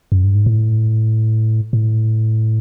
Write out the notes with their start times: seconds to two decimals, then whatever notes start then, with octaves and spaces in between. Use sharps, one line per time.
0.12 F#2
0.24 G2
0.35 G#2
0.46 A2
1.73 A2